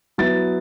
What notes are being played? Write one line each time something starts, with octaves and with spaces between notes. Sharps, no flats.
F#3 B3 E4 A6